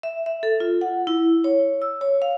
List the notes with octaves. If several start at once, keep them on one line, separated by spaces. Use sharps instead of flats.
E5
E5
A4
F4
F#5
E4
C#5
E6
C#5
F5